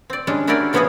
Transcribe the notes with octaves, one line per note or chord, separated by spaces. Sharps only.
C4 D5
G3 G#3 C#4 D4
D4 E4 F#4 G4 A#4 D5
C#3 F3 B3 E4 F#4 G#4